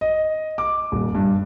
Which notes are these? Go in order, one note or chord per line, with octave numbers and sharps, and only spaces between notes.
D#5
D6
D#1
G2